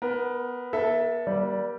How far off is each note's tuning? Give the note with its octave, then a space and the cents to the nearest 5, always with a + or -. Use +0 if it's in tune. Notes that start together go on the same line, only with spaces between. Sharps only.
B3 +0 A#4 +20
A#3 +45 A4 +0 E5 +0
G3 -10 A#3 +40 D5 +0